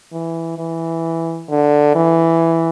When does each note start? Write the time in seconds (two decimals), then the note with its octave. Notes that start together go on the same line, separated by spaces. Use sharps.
0.12 E3
0.58 E3
1.50 D3
1.95 E3